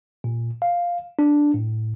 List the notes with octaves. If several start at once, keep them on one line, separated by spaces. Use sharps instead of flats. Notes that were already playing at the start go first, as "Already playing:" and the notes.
A#2
F5
D4
A2